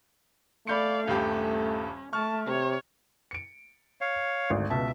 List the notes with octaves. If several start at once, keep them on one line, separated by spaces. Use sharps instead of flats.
A3 D5 F5 B5 G6 C#7
D#1 G2 C#4 G4
A3 A5 C#6 F6
C3 C#5
C#7 D7
C#5 F5
G#1 D2
C#2 B2 E5 A5